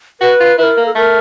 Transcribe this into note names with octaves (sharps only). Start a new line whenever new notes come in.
F#4 B4
F4
E4 B4
A#4
A#3
A4
A3 A#4